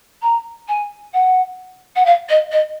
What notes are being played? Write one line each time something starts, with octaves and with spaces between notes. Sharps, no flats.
A#5
G#5
F#5
F#5
F5
D#5
D#5